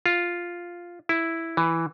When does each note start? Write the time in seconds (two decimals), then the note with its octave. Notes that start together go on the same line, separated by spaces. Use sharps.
0.06 F4
1.09 E4
1.57 E3